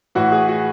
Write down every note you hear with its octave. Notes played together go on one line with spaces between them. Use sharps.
A2 E3 F#4
G#4
F#4